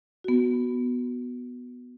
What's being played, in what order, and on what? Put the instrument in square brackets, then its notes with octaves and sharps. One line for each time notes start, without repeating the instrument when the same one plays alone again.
[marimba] B3 F#4